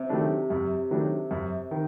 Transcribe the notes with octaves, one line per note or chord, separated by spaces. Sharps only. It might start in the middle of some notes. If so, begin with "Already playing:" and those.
Already playing: C3
D#3 F#3 A3 D4
F#2
D#3 F#3 A3 D4
F#2
D#3